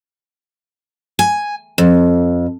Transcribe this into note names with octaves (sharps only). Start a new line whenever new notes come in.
G#5
F2